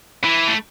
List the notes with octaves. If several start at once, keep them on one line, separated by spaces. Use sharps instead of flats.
E3
A3